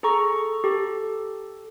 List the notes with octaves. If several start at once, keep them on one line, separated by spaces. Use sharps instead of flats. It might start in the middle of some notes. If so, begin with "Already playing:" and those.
G#4 A4 A#5 C#6
G4 A4